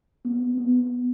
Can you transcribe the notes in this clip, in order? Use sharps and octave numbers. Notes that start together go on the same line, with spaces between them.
B3
B3